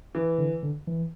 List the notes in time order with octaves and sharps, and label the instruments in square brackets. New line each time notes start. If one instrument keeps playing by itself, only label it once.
[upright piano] E3
[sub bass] D3
D3
E3